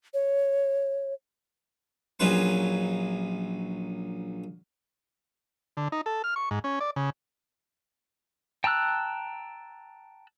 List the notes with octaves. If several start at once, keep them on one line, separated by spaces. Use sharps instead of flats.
C#5
A#1 A#2 F#3 C#4 B4 C6
D3
D#4
A4
F6
C#6
G#2
C#4
D5
C#3
G5 A5 A#5 E6 F#6